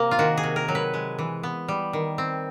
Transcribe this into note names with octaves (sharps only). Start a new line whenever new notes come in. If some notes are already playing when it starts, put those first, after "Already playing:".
Already playing: C3 A#3
F4
D#3 F#4
G#4
C3
A#4
F#3
B4
G#3
E3
B3
G3
D#3
C4